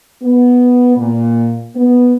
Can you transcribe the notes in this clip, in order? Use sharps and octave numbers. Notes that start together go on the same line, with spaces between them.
B3
A#2
B3